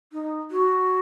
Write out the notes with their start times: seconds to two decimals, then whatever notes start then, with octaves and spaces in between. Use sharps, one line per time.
0.13 D#4
0.51 F#4